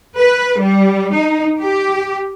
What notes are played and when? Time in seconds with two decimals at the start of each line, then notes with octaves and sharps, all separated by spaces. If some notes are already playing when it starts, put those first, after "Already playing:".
0.17 B4
0.59 G3
1.13 D#4
1.60 G4